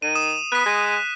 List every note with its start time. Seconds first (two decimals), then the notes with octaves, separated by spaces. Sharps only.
0.02 D#3 D#7
0.15 D#6 E7
0.52 B3 F#6 B6
0.66 G#3